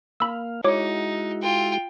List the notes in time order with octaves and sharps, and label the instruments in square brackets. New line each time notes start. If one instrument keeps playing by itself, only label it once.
[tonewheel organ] A#3 F5 [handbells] B5 E6
[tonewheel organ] G#3 E4 F#4 [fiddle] D#4 [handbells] C#5 D6
[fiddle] F4 G5